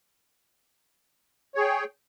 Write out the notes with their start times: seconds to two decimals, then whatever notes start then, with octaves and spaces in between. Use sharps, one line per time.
1.55 C#5
1.58 G#4
1.60 G5